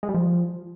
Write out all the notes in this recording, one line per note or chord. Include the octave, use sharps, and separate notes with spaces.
G#3
G3
F3